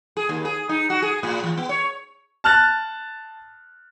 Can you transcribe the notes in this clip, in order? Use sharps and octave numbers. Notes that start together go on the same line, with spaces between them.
G#4
D#2
G#4
D#4
F#4
G#4
A2
E3
B3
C#5
A5 F6 F#6 A6